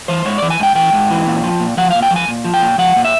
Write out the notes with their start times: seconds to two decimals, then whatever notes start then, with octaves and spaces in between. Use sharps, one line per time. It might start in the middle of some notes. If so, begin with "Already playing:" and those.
0.08 E3 C5
0.25 G#2 C#5
0.38 E3 D5
0.50 G#5
0.60 G#2 G5
0.75 E3 G5
0.93 G#2
1.10 E3
1.26 A#2
1.44 F3
1.60 A#2
1.77 F3 F#5
1.91 A#2 F5
2.02 G5
2.11 F3
2.16 G#5
2.28 A#2
2.44 F3
2.54 G5
2.62 A#2
2.78 F3 F#5
2.96 A#2
3.05 E5